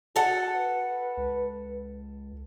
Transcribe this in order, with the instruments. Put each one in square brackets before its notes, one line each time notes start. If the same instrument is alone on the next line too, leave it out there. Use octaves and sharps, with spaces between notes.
[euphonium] F#4 [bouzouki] A4 F#5
[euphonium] B4
[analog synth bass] C#2